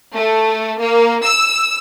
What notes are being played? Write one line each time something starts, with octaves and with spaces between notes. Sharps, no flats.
A3
A#3
E6